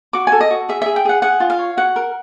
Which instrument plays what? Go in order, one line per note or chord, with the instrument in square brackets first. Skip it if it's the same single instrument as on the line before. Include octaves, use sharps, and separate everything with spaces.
[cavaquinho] F#4 D6
A4 G#5
D#5
F#4
G#4 E5
G#4 E5
G5
G#4 F#5
G#4 F#5
F4
F5
C#5
F#4 F#5
A#4